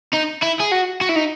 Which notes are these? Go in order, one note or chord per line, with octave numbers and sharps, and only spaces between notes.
D#4
E4
G#4
F#4
F#4
E4
D#4